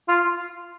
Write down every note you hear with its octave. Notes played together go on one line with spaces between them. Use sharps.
F4